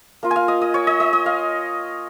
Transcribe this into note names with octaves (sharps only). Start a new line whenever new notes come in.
A#3 F4
G#5
F5
D#5
D#5
C#5
D#5
D#5
D#5
F5